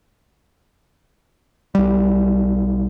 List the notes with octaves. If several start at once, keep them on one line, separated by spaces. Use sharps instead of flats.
B1 G3